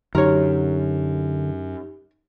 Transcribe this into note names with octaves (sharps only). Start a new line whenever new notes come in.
F#2 D3 D#4 G4 A#4 C#5